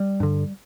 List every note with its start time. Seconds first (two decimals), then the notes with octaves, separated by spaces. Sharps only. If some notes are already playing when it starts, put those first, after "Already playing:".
Already playing: G3
0.20 G2 D3